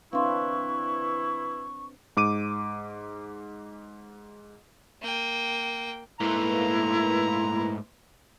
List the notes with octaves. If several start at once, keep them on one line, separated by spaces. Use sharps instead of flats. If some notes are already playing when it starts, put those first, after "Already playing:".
E3 C4 D4 E4 B4 F5 C6 C#6
G#2 D6 D#7
A#3 G5
G#2 A3 A#3 E4 B4 A#5 C6